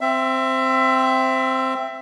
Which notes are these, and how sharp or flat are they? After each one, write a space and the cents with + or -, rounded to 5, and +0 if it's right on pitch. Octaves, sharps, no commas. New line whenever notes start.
C4 +0 E5 +20